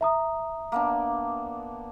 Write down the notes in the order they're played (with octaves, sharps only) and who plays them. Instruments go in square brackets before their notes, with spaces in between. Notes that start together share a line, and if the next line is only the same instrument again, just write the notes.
[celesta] E5 A#5 D#6
[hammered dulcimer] A#3 B3 D4